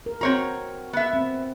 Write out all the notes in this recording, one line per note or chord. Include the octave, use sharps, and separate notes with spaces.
A#4
C4 F#4 C#5 A#5
B3 E5
C4